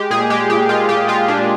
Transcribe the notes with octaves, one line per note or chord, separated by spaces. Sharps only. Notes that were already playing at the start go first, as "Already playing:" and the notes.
Already playing: G#3 G4
A#2 G#4
G#3 G4
A#2 G4
G#3 F4
A#2 G4
G#3 F4
A#2 D4